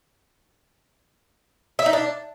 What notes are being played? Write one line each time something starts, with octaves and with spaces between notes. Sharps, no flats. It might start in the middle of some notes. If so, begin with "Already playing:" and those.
E5
D#4
D4